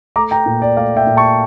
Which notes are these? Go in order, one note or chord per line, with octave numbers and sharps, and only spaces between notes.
A3 A#5 D6
G5 A#5
A#2
D5
A3 D5 F5
E5 G5
A#2
A5 C#6